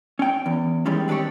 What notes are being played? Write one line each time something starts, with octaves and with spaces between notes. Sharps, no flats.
C#4 G5
E2
D#3 E3 G3 G#3 C#4
C4 D4 F4 G4 C#5